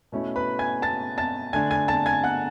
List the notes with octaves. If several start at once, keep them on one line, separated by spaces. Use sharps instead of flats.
B2 A3 C#4 E4
B4 B5
G#5 G#6
A5 A6
A5 A6
D3 A3 D4 G#5 G#6
G#5 G#6
A5 A6
G#5 G#6
F#5 F#6